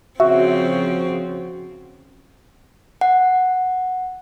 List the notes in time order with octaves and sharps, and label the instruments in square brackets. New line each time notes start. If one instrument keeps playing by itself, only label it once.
[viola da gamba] C#3 F3 C4 [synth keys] F#4 [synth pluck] E5
[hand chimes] F#5